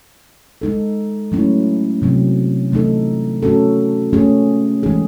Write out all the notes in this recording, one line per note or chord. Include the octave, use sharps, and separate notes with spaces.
G#3 D#4 A4
F#3 A3 C#4 E4
C3 F#3 C4
E3 A3 D#4 A4
A3 C#4 F#4 A4
A3 C#4 G#4
E3 G#3 D#4 G#4